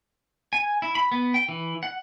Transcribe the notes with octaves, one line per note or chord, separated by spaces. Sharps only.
G#5
E4
B5
B3
G5
E3
F#5